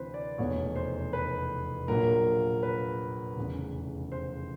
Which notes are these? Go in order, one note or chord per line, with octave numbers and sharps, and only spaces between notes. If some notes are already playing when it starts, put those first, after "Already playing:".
Already playing: D2 C3 E3 C4 B4 C5
D5
F1 E2 B2 C#5
C5
B4
A#1 A#2 F#3 A#4
B4
F1 E2 C#3
C5